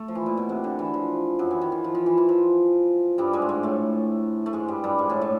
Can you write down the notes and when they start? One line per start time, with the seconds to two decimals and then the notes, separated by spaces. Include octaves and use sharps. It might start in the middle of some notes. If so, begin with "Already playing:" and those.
Already playing: A3
0.08 F3
0.15 E3
0.26 A#2
0.37 B2
0.49 C3
0.64 D3
0.79 E3
0.94 F3
1.39 F#2 F#3
1.51 E3
1.61 D#3
1.72 E3
1.84 F3
1.95 F3
2.06 E3
2.18 E3
2.29 F3
3.18 G2 G3
3.33 G#2 G#3
3.42 A3
3.49 G#2 G#3
3.63 A2 A3
4.46 A3
4.53 G#2 G#3
4.68 G2 G3
4.84 G2 G3
4.98 G#2 G#3
5.10 A2 A3
5.21 A2 A3